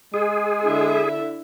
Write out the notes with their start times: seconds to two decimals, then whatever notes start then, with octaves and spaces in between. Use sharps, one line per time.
0.14 G#3 G#4
0.64 D3 E4 E5